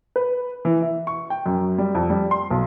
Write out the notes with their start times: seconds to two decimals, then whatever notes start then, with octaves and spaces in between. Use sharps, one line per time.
0.16 B4
0.65 E3
0.82 E5
1.07 C#6
1.30 G5
1.46 F#2
1.78 G3
1.95 F2
2.10 G3
2.31 C6
2.51 B1